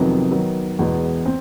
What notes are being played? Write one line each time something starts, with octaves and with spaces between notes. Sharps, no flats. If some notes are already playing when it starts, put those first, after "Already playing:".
Already playing: F2 C3 D#3 F#3 B3
D#3 F#3 B3
E2 B2 G#3 B3
C4